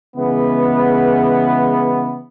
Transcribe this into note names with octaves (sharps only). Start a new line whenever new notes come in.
C#3 E3 G#3 B3